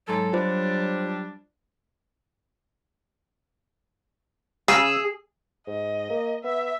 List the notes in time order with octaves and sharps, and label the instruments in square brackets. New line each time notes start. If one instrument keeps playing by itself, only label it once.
[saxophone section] G#2 A4 [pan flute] F#3
[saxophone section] G3 D4 [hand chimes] F4 C5
[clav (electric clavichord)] C#3 [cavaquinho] G#4 [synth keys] E6
[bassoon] G#2 [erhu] D#5
[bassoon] A#3
[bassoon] B3 [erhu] E5